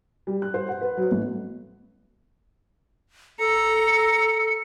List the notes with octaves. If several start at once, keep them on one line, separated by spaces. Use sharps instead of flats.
G3
F#6
C5
F#5
B4
F#3
A1
A4 A#5 C#7